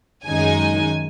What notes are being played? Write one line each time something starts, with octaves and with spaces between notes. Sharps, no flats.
F#2 D#3 G#3 D#4 G#5